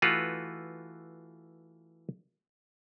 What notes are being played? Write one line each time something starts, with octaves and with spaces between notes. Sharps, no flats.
E3 A3 F4 F#4 B4